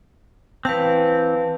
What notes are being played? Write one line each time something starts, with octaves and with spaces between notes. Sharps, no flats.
E3 C4 B4 F5 A5